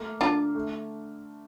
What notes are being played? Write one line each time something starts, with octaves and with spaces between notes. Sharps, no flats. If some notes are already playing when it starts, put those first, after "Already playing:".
Already playing: A3 A#3
D3 D4 F4
A3